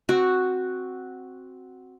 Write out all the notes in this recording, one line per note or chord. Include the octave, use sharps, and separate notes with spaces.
C4 F#4